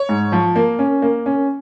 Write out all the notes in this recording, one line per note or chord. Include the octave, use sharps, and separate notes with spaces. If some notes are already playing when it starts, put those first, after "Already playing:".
Already playing: C#5
G#2
F3
A#3
C#4
A#3
C#4